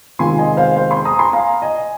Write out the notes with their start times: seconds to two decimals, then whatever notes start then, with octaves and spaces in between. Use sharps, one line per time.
0.19 C3 D#3 G#3 C4 F4 G#5 C6
0.38 D#5 G#5
0.57 C5 F5
0.76 C5 F5
0.91 G#5 C6
1.05 A#5 D#6
1.19 G#5 C6
1.33 F5 A#5
1.62 D#5 G#5